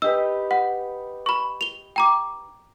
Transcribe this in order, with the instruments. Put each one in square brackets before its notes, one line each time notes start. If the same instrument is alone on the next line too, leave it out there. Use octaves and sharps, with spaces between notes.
[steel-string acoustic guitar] D#4 G4 B4 [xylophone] E6
[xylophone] F#5
B5 C#6
F7 G7
G5 A#5 D6